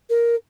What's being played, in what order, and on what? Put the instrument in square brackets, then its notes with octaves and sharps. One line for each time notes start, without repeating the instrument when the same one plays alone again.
[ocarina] A#4